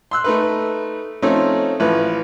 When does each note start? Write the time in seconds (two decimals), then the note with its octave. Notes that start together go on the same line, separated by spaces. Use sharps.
0.11 C6 E6 F#6
0.24 A3 D#4 B4
1.22 F3 A3 C4 C#4 D#4
1.80 A1 F3 B4